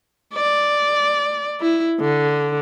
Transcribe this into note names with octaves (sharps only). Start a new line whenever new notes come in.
D5
E4
D3